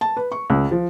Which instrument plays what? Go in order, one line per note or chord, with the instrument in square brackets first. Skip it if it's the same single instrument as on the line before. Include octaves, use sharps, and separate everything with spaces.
[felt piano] A5
B4
C#6
C#2
F3